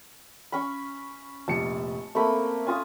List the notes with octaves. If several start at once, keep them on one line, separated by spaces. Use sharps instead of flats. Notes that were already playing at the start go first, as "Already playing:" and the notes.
C#4 B5
F1 A#1 A5 C#7
A3 A#3 C4 B5
C#4 F4 G#5 D#6